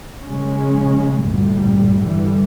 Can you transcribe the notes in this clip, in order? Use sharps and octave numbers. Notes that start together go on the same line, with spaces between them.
A#1 C#3 G#3 C#4
A1 D2 G2 A#2 G3
G2 D3 E3 G3